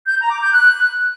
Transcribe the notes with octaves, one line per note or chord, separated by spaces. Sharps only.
G6
A#5
D6
G6
F#6